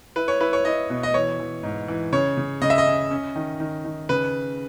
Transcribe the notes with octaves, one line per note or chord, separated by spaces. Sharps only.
E4 B4
C#5
E4 B4
C#5
E4 D#5
B2
D#5
E3 C#5
E3
G#2
E3
C#3 C#5
C#3
C#3 D#5
E5
D#5
C#4
C#4
D#3
D#3
D#3
C#3 B4